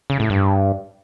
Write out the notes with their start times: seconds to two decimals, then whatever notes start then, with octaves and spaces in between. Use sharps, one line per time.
0.10 C#3
0.20 A2
0.30 G2